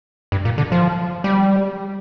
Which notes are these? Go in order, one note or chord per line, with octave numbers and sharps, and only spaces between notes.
G2
A#2
D3
F3
G3